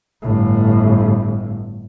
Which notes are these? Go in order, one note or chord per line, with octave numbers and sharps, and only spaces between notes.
G1 A2